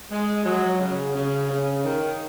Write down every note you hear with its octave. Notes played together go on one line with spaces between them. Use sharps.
G#3
F#3
C#3
C#3
C#3
D#3